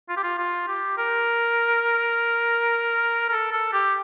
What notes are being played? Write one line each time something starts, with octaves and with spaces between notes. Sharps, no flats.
F4
G4
F4
F4
G4
A#4
A#4
A4
A4
G4